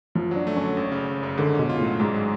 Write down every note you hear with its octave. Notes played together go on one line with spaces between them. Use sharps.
F#2 F3
F#3 D4
A3
C#4
D3
G#1
C#3
G#1
F#2
G#2 D3
B2 C#4
F4
A2
F#3
G#1 G#2
G#3